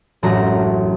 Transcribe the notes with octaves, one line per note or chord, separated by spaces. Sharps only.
E1 A1 F#2 A3 F#4 A#5